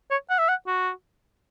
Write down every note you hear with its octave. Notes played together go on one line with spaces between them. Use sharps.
C#5
F#5
E5
F#5
F#4